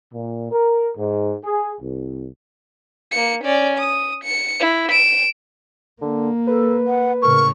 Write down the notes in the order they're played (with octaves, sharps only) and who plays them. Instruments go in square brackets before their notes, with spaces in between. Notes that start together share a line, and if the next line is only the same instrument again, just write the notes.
[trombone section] A#2
A#4
G#2
G#4
C2
[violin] A#3 C#7
C#4 D5
D#6
C#7
E4
D7 E7
[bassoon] D3 [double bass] A#3
[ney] A4 [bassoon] B4
[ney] F#5
[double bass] A2 C#3 [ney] A#4 [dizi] C#6